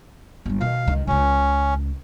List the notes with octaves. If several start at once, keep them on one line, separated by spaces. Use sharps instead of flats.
G1 G3
B2 D#3 F5
C#2 D#3
C#2 C#3 C#4